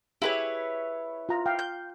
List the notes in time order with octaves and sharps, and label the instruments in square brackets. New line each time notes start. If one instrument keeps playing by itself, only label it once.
[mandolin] E4 B4 C#5 [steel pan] G4 G#4 E5
[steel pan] F4 A#5
F5 G5
[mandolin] G6